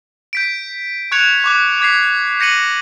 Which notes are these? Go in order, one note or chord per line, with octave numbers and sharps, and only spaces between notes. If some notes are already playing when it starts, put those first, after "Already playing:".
G6 B6 D7
C#6 F#6 G#6 C#7 F7
C#6 D6 F#6
D6 G#6 B6 C7
G6 A#6 C#7 D#7 F#7